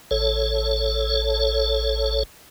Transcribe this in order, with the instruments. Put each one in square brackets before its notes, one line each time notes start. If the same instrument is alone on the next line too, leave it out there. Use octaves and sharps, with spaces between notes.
[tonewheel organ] A1 A4 C#5